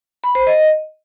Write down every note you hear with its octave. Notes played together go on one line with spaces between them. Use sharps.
B5
C5
D#5